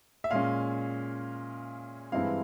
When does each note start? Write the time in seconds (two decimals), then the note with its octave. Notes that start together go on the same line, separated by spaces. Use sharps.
0.24 E5
0.30 A#2 G#3 C#4 F5
2.12 G2 E3 G#3 C4 E4 F5